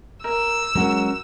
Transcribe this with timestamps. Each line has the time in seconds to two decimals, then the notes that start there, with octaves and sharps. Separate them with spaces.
0.24 A#4 E6
0.75 F#3 G#3 C#4 F#4 A#4